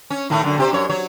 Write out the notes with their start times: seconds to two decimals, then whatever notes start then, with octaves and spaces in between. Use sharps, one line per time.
0.10 C#4
0.30 A2 D#3 A3
0.43 F#2 D3
0.58 C3 G4 C5
0.73 F#2 C#5
0.90 F#3 C#5